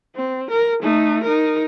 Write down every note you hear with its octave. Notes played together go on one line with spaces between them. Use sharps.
C4
A#4
A3 D#4
D#4 A#4